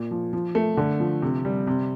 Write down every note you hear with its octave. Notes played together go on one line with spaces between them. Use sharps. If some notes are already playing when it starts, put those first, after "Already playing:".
Already playing: A#2
F3
F3
A3
D3
F3
C3
G3
C3